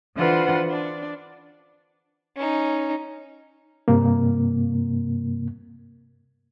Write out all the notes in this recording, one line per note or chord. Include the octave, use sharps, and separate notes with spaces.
D3 E3 F4 B4 C5 F#5
D4
C#4 D#4
G2 C3 A#3